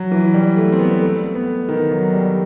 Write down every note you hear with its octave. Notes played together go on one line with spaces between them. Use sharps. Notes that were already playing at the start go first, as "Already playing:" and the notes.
Already playing: F#3
E3
G3
A3
C4
B3
A3
B3
D#3
F#3
G3